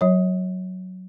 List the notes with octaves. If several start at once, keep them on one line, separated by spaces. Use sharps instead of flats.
F#3 C#5